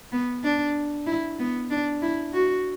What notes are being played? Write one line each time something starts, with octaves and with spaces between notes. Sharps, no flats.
B3
D4
E4
B3
D4
E4
F#4